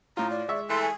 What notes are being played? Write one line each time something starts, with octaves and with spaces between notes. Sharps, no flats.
A2 F4 A#5
D5
G#3 E5 C#6
E3 A3 C6
G#5